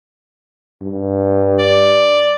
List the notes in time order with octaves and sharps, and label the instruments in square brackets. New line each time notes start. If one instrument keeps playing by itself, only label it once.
[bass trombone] G2
[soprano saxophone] D5